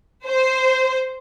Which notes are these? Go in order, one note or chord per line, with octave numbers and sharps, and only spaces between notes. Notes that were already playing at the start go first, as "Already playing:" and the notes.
C5